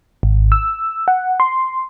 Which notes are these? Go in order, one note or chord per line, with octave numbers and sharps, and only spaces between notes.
G#1
E6
F#5
C6